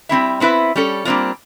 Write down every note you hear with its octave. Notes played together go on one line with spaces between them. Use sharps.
G3 C4 E4 E5
B3 C4 E4 B4 E5
G3 C#4 A4
G3 A#3 C4 D4 F4